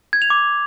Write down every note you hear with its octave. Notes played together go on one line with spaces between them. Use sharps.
G#6
F7
D6